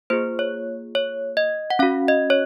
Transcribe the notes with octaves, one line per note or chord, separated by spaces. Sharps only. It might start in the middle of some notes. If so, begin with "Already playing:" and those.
A#3 F4 G#4 C5
C#5
C#5
D#5
F#5
C#4 F#4 F5
D#5
C#5